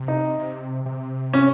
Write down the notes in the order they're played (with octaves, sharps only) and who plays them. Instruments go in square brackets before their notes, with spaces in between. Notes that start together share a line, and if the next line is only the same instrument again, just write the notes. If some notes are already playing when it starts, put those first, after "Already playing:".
Already playing: [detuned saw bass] C3
[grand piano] D#4
[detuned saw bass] C3
C3
[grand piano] C#4